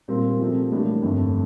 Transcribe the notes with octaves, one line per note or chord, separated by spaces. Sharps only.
A#2 G3 C4 F4 A#4
C3 F3 A3 C4
A1 A2 G3 A#3 D4
G1 F2 D3 A3